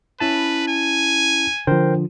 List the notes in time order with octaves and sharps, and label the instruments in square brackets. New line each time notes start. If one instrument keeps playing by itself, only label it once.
[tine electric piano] C#4 E4 A5 [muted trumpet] B4
[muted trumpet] G#5
[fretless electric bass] D3 F3 [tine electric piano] A#4 C5 G5